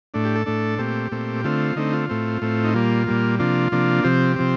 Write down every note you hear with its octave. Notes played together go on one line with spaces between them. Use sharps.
A2 A3 D4
G4
A4
A2 A3 D4
A#2 A3 C4 G4
A#2 A3 C4
D3 A3 C4 F4
D3 A3 C4 D#4
F4
A2 A3 C4
A2 A3 C4
D#4
A#2 G3 A#3 F4
A#2 G3 A#3
C3 F3 A#3 D4 F4
C3 F3 A#3 D4
C3 F3 C4 G4
C3 F3 C4